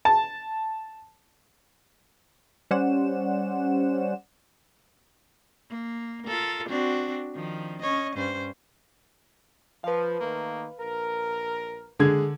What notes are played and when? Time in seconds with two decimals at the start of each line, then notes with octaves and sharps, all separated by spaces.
0.05 A5
2.71 G3 C#4 C5 D5 F#5 E7
5.70 A#3
6.25 F4 A4 A#4
6.69 C4 D4 F#4
7.35 D#3 F3
7.81 C#4 C#5 D#5
8.16 G2 C#4 C5
9.84 F3 B4 F5
10.19 D#3 A3 A#3
10.79 A#1 A#4
11.99 D3 G#3 G#4 G#6